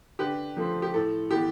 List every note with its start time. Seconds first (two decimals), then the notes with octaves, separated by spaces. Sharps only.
0.19 D3 G4 B4
0.57 F3 A3 C4
0.82 G4
0.94 A2 A4
1.31 E3 B3 G4